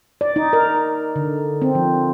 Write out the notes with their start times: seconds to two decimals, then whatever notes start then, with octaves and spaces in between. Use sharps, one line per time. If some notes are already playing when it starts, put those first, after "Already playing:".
0.21 D5
0.36 D#4
0.53 A#4
1.16 D3
1.62 C4
1.75 F3